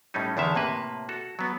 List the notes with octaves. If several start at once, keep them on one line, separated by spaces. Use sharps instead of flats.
A2 G3 A3 C#4 D#4
E2 D3 D#3 E5 F5
A2 C3 A#3 B4
F#4 A4
F#3 B3